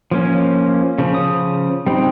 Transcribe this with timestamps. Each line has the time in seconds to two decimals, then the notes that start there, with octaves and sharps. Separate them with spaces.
0.11 F3 A#3 C#4
0.98 C#3 F3
1.14 D#6
1.87 G3 C4 D#4